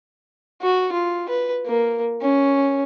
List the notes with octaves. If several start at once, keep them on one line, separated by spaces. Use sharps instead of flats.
F#4
F4
B4
A#3
C#4